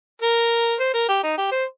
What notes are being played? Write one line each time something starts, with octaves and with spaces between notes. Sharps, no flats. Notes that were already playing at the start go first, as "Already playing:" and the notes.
A#4
C5
A#4
G4
D#4
G4
C5